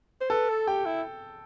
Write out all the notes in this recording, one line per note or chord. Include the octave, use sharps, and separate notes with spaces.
C5
A4 B4
A4
G4 G5
E4